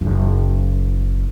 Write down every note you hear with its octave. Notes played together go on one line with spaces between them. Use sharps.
F#1 D#3